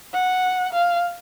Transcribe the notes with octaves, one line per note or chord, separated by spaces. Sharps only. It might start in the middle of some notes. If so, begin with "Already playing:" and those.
F#5
F5